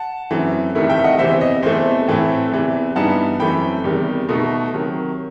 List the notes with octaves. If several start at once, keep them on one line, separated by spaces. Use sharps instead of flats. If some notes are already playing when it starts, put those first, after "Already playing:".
Already playing: F#5 A5
F#2 E3 A3 C4
C2 C3 D#3 A3 E4
E5 G5
D#5 F#5
E2 C3 E3 C5 E5
D#5
E2 C3 E3 A3 C5
A2 E3 A3 C4 E4
E2 C3 E3
G2 E3 G3 B3 D#4 F#5 A5
F#2 E3 A3 C4 G5 B5
E2 C3 D#3 G3
B2 A3 D#4
C3 D#3 F#3